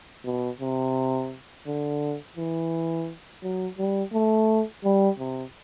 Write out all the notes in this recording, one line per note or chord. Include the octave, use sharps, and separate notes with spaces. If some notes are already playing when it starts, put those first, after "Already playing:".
B2
C3
D3
E3
F#3
G3
A3
G3
C3